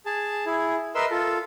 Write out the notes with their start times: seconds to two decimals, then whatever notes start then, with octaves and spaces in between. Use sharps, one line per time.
0.06 G#4 A5
0.46 E4 G#4
0.95 A#4 B4 D#5 E5 C6 E6
1.11 F4 A4